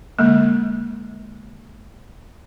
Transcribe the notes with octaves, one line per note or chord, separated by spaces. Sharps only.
D3 G#3 A#3